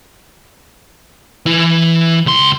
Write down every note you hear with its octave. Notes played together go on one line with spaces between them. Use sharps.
E3 E4
C#2 C6